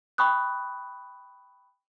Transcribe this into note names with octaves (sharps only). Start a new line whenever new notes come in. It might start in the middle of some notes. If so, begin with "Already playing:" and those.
G5 B5 C#6 D#6 F#6